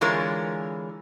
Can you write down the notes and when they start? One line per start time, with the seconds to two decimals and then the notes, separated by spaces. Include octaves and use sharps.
0.01 D3 E3 G#3 F4 A#4 C#5